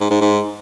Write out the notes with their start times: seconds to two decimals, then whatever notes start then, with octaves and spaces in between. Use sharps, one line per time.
0.01 G#2
0.11 G#2
0.21 G#2